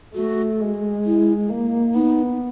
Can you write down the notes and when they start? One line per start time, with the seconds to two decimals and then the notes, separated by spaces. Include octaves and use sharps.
0.15 A3 F#4
0.60 G#3
1.05 E4
1.49 A#3
1.94 B3 D#4